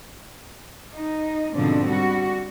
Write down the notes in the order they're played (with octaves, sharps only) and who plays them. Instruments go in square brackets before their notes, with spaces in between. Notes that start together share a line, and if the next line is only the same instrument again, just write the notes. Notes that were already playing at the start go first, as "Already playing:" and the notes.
[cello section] D#4
G#2 B2 D3 F3 C4 D4
G3 F#4